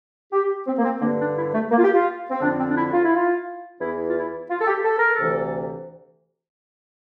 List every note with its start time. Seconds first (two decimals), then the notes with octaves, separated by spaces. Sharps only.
0.32 G4
0.67 C4
0.78 A#3
0.84 C4
1.01 G2 D3 A#3
1.19 D4
1.37 E4
1.54 A3
1.71 A#3
1.78 F4
1.83 G4
1.94 F4
2.31 C4
2.41 F2 D3 D4
2.59 C4
2.70 D4
2.76 E4
2.93 F4
3.04 E4
3.15 F4
3.80 E2 E3 E4
4.06 F4
4.15 E4
4.50 F4
4.61 A4
4.67 G4
4.84 A4
4.99 A#4
5.12 A4
5.19 D2 C3 E3